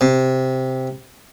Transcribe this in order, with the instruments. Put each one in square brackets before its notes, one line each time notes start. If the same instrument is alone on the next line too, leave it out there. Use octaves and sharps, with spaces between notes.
[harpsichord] C3